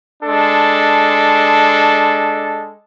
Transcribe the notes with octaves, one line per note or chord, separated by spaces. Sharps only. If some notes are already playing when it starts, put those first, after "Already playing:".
G#3 D4 A4